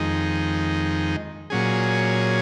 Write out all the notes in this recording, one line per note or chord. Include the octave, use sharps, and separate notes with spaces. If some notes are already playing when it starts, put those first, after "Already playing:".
Already playing: F2 D#3 G#3 D#4
A#2 F#3 C#4 G#4